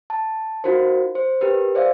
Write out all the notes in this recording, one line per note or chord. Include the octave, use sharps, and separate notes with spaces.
A5
D#4 F4 F#4 A#4 C5
C5
G4 A#4 B4
C5 D5 E5 F5